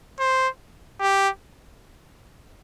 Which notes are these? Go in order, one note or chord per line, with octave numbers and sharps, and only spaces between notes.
C5
G4